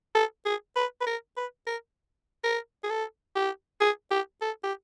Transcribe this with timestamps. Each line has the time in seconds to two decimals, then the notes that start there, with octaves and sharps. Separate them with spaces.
0.15 A4
0.45 G#4
0.76 B4
1.01 B4
1.07 A#4
1.37 B4
1.67 A#4
2.44 A#4
2.84 G#4
2.90 A4
3.36 G4
3.81 G#4
4.11 G4
4.42 A4
4.64 G4